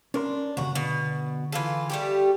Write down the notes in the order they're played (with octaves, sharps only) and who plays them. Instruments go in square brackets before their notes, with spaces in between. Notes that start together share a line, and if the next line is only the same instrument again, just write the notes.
[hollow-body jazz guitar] C#4 A#4 C6 [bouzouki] D4
[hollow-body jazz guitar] C#2 C#3 [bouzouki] F#4
[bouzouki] B2 [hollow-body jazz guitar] D3
[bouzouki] E3 F4 A4
G3 A3 G4